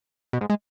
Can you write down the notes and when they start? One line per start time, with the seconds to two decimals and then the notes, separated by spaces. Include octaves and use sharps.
0.33 B2
0.41 G#2
0.50 G#3